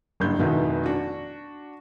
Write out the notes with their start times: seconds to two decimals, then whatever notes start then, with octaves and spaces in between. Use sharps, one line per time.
0.20 F#1 G2 G6
0.39 F1 B2 D#3 E4
0.86 D4 F#4